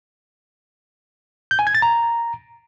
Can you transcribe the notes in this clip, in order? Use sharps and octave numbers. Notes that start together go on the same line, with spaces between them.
G6
G#5
G#6
A6
A#5